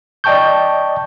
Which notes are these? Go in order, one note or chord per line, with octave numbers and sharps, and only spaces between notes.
D5 D#5 G5 A5 C#6 G6